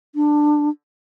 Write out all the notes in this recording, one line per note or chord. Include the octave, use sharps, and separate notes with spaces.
D4